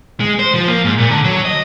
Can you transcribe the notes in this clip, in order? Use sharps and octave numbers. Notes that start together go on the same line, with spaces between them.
G#3
C5
F3
A#3
G#2
A#2
D3
F#3
D#5